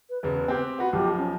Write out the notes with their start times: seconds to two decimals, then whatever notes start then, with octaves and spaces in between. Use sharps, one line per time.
0.10 B4
0.23 E1 C#3 B4
0.48 C4 G4
0.79 B3 F#4 B4 F#5
0.93 B1 F3 G4
1.18 C#4